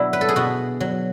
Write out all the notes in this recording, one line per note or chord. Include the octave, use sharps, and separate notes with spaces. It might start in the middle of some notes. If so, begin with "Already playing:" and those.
Already playing: B2 F#3 D4 E4
B4
A4
G#4
B2 F#4
F#3